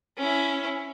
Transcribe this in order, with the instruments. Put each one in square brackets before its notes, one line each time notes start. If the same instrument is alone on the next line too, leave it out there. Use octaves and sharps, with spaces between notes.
[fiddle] C#4 E4